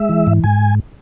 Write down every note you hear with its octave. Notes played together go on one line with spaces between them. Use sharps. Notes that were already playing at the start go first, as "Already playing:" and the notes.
Already playing: G#3 E5
E3
G#2
G#2 G#5